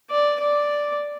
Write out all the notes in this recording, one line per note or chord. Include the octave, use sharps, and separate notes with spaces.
D5
D5